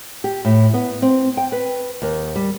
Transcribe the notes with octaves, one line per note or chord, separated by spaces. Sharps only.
G4
A2
B3
C4
G5
B4
D#2
G3